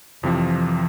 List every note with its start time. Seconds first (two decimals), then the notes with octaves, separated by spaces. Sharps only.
0.23 F2 C3 E3 F3